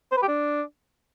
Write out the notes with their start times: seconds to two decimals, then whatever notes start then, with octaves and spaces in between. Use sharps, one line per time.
0.12 C5
0.17 B4
0.23 G4
0.28 D4